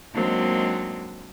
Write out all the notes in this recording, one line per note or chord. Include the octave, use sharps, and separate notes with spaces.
F#3 G#3 A#3 C4 D4 D#4